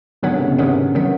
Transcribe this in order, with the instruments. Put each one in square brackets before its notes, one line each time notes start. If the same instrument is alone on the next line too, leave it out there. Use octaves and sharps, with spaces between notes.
[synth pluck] G#2 D#3 F#3 B3 [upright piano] D3
[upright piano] C3
C#3
B2
[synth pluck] G#2 D#3 F#3 B3 [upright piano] C3
[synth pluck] D#3 F#3 B3